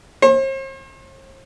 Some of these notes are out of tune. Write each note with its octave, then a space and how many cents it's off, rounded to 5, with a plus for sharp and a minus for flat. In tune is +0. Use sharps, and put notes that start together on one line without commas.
C5 +45